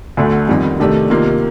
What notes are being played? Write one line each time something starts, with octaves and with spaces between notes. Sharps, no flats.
D2 D3 A3
F2 D#3 G3
C3 D#3 A3 D4 G4
C3 D#3 A#3 F4